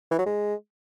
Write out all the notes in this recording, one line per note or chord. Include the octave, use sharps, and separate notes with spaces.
E3
F#3
G#3